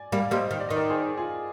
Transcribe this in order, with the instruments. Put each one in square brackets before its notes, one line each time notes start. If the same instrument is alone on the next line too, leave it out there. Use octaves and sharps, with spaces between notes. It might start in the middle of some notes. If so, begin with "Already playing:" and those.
Already playing: [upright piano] D5 G#5
[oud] G3 A#3 [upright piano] D5 F5
[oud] G3 A#3 [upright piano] C5 D#5
[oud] D#3
[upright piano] D5
[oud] D#3 [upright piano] D#5
[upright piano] A#4 D5
G#4 C5
F4 G#4